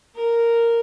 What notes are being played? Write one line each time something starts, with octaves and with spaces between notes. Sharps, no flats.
A#4